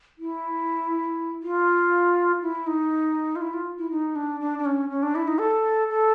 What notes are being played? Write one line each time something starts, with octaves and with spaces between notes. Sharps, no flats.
E4
F4
E4
D#4
F4
E4
F4
E4
D#4
D4
D4
D4
C#4
C#4
D4
E4
D#4
A4
A4